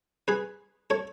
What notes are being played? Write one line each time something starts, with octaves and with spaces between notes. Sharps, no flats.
G#4 B4
A4 C#5